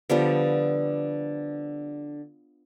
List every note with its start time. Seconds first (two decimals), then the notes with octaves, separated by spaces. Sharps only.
0.10 D3 F3 G3 B3